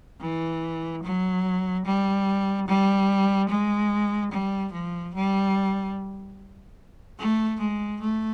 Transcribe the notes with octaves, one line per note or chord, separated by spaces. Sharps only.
E3
F#3
G3
G3
G#3
G3
F3
G3
A3
G#3
A3